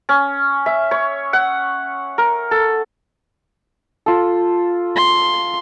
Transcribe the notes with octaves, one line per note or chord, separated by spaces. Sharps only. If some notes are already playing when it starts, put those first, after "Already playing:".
C#4
E5
C#5
F#5
A#4
A4
F4 A4
C6